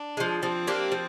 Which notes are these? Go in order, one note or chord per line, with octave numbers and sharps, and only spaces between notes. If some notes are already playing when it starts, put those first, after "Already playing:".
Already playing: D4
F3 G#3
F3 C4
A#3 D4 G4
F3